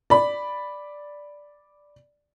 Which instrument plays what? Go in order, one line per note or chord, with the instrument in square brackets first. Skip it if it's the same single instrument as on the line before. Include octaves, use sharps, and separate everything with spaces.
[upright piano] D5 B5